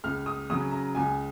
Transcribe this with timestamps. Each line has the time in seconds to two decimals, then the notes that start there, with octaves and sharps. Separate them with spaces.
0.04 C#2 F6
0.26 D#6
0.50 C#3 F#3 C#4 D#6
0.72 A#5
0.95 C#2 G#5